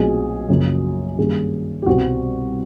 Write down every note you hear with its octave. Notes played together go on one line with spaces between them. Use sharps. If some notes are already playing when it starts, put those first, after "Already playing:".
Already playing: B1 A#2 F#3 A3 C4 G#4
F#2 C#3 F3 A#3
G2 D#3 G3 A#3 C#4 G#4
G4
C2 B2 G3 C4 F#4